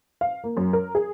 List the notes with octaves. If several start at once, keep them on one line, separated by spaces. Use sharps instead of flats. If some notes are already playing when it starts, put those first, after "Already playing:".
F5
A#3
F#2
A#4
G#4